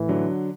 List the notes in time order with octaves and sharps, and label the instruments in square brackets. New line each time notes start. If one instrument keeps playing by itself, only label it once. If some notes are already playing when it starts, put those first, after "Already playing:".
Already playing: [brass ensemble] A2 E3
[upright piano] D3 F#3